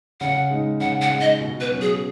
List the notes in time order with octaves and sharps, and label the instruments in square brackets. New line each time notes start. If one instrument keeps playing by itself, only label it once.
[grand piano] C#3 [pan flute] F#5
[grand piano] G#3 D#4
[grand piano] C#3 [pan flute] F#5
[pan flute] F#5
[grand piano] G#3 D#4
[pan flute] D#5
[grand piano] B2
[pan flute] B4
[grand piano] F#3 C#4
[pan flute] G#4